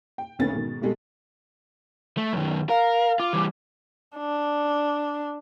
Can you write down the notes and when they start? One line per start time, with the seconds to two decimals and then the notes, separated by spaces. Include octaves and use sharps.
0.18 G5
0.39 F#1 D2 D#3 B3 C#4 A6
0.53 G#2 B2 D#3
0.81 B1 B2 G3 G#3 G#4 A4
2.17 A3
2.33 F#2 D#3
2.69 A#4 F5
3.20 F4 D6
3.33 E3 G3
4.18 D4